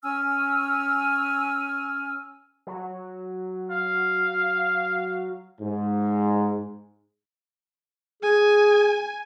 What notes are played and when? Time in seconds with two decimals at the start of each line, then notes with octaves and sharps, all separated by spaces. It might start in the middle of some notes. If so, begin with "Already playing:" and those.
0.03 C#4 G#5 E6 F6
2.67 F#3
3.71 F5
5.60 G#2
8.23 G#4 G#5